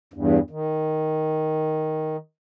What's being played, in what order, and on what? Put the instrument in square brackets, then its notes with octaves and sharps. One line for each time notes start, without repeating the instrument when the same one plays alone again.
[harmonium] E2 G2
D#3